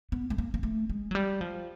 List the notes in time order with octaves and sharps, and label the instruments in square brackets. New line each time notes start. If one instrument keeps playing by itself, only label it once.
[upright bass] B3
A3
A#3
A#3
A3
G#3
F#3
G3
F3